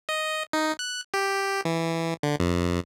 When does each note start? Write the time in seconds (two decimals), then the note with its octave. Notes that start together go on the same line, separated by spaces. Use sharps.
0.09 D#5
0.53 D#4
0.79 F#6
1.14 G4
1.65 E3
2.23 D3
2.40 F2